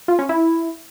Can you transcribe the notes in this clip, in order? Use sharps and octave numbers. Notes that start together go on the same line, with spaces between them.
F4
C#4
E4